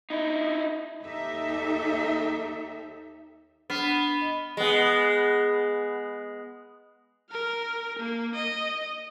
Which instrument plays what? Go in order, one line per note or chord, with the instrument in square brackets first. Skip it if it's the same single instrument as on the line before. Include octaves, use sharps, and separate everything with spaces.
[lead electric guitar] D#4 E4
[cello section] D#2 D#4 G4 A4 E5
[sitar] B3 [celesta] D4 F6 C7
[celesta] D#5 G7
[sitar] G#3 B3
[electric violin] A#4 F6
A#3
D#5